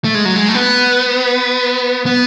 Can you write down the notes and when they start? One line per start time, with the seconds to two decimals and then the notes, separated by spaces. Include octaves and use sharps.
0.04 A3
0.15 G#3
0.25 F#3
0.36 G#3
0.48 A3
0.54 B3
2.06 B3